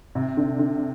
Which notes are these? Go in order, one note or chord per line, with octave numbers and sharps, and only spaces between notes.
C3
D3
D3